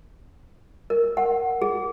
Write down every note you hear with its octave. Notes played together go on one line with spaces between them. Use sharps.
A#4
F#5
G#4